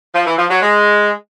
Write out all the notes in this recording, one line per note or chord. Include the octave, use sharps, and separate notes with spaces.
F3
E3
F3
F#3
G#3